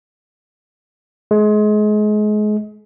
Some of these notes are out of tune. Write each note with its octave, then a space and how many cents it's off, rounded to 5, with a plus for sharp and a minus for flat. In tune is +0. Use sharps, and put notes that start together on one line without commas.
G#3 +30